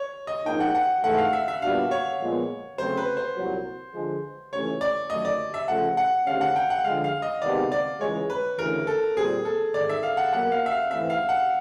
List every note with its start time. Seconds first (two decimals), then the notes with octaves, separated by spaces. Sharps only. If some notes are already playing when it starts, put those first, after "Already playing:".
Already playing: C#5
0.27 D#5
0.46 A#1 G#2 F3 A#3 D#4 G5
0.60 F#5
0.75 F#5
1.04 G#2 E3 A3 F#5
1.18 F5
1.33 E5
1.48 E5
1.62 A#2 G3 B3 D4 F#4 F5
1.91 C#5
2.20 A#2 F3 G#3 B3
2.78 C#3 F#3 A3 C4 C5
2.97 B4
3.17 C5
3.37 C2 A#2 F#3
3.94 D3 F3 G#3
4.52 C#2 C3 E3 A3 C#4 C#5
4.81 D5
5.10 F#2 D#3 F#3 A3 D#5
5.25 D5
5.54 E5
5.68 C#3 F3 A3 F#5
5.97 F#5
6.26 D2 C3 D#3 G#3 C#4 F5
6.41 F#5
6.56 G5
6.70 F#5
6.84 D3 F3 G#3 F5
7.04 F5
7.22 D#5
7.42 C3 D#3 G#3 B3 D#4 D5
7.72 D5
8.00 C#2 C#3 E3 G#3 C#5
8.30 B4
8.58 D2 C#3 E3 A#4
8.87 A4
9.16 A#2 G3 C4 G#4
9.45 A4
9.74 G#1 G#2 D#3 D5
9.89 E5
10.03 F5
10.17 F#5
10.32 B2 F#3 A#3 F#5
10.52 F5
10.66 E5
10.71 F5
10.90 G#2 E3 A3 C4 E5
11.10 F5
11.29 F#5